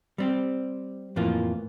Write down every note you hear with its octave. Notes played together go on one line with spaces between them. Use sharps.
G3 C4 G4
F2 A2 E3 F3 A#3 F4